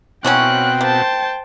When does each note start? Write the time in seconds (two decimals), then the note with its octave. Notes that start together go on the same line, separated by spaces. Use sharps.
0.24 B2 E3 F#3 C4 C#4 F#4 G5 F#6
0.81 A#3 C5 A5